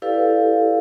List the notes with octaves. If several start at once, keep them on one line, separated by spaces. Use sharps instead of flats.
E4 G4 A4 B4 D5 F5